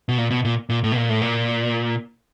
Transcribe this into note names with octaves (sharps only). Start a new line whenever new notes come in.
B2
A#2
B2
A#2
A#2
A2
B2
A#2
A2
A#2